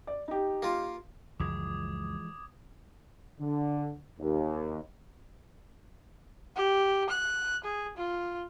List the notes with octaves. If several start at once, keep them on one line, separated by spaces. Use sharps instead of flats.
D5
D#4 G4
A#3 F4
C#2 F#2 E3 F3 G#3 D6 D#6 G#6
D3
D#2
G4
F#6
G#4
F4